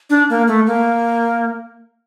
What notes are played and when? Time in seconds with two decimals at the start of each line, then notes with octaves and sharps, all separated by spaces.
0.10 D4
0.30 A#3
0.48 A3
0.67 A#3